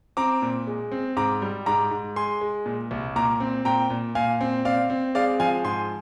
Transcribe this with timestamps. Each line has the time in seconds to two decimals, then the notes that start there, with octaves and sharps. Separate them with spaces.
0.17 C4 A#5 D6
0.42 A#2
0.67 G#3
0.92 C4
1.17 G#2 A#5 D6
1.42 G3
1.66 G#2 A#5 D6
1.91 G#2
2.16 G#3 G#5 C6
2.41 G#3
2.66 A#2
2.91 C2
3.16 A#2 A#5 D6
3.40 C4
3.65 A#2 G5 A#5
3.90 A#2
4.15 A#2 F5 G#5
4.41 C4
4.65 C4 D5 F5
4.90 C4
5.15 G#3 D5 F5
5.40 F3 F5 G#5
5.64 G#2 G#5 C6